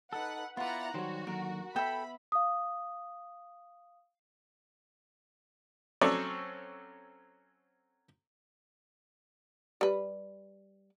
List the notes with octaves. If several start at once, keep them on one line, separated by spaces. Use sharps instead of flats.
D#4 A4 B4 F#5
B3 E4 F4 B4 D5 F#5 A#5
D#3 F#3 G3 F#4 C5 C#5
D#2 D3 F#3 A#4
B3 A4 E5 G5 B5
F5 D#6
F#3 C4 C#4 A4 C#5 D5
G3 B4